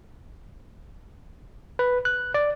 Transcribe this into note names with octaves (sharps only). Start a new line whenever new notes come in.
B4
F#6
D5